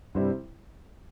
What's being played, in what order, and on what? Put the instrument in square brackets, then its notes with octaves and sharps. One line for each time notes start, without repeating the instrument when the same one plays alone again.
[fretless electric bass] G2 [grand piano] C3 G3 C4 E4